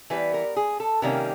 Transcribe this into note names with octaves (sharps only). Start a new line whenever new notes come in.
E3 G3 B3 B4
A#4
G#4
A4
C3 D#3 G3 A#3 C#4 A#4